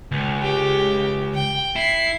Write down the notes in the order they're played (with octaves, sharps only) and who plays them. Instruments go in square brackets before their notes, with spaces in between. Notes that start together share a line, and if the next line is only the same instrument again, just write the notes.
[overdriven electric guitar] C#2
[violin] G4
G5
[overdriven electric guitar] E4 [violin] C7